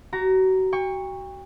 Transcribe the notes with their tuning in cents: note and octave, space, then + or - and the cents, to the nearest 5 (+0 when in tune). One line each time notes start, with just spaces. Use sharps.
F#4 +35 A#5 +0
G5 +35 C#6 +0